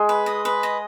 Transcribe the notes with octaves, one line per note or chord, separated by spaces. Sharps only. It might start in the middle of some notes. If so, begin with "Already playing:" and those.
Already playing: G#3
B4
D#5
B4
D#5